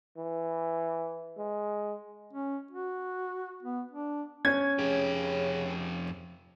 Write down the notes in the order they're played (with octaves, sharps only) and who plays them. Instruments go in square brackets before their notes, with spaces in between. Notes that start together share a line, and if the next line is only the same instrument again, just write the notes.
[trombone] E3
G#3
[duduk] C#4
F#4
B3
D4
[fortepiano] C#4 [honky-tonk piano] G#6
[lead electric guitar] F2 G4 [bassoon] C#3